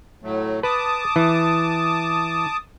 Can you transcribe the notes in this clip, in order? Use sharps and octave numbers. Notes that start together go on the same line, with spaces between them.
A2 F#3 A3
B4 A5 D6 D#6
E3